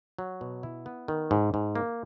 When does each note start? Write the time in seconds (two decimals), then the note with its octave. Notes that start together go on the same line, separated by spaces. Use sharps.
0.19 F#3
0.41 B2
0.63 E4
0.86 B3
1.08 D#3
1.31 G#2
1.54 G#2
1.75 A#3